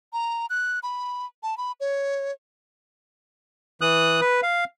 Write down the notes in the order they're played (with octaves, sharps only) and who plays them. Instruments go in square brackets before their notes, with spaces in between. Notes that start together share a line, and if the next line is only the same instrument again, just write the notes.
[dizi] A#5
F#6
B5
A5
B5
C#5
[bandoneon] E3 D#6 F#6
B4
F5